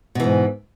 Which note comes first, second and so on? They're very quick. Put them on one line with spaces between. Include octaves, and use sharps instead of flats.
B2 E3 G#2